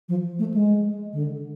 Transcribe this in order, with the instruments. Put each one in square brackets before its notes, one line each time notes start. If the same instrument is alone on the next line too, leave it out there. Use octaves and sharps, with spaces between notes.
[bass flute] F3
A3
G#3
D3